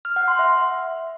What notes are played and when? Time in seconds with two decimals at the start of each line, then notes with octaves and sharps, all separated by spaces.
0.05 F6
0.16 F#5
0.28 C6
0.39 E5